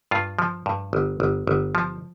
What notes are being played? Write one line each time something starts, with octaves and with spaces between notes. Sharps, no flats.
G2 F4
F3
G2
G1
G1
G1
F3